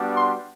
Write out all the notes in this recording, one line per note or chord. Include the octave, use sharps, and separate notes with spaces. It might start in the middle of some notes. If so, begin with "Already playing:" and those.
Already playing: G3 B3 D4 F#4
C6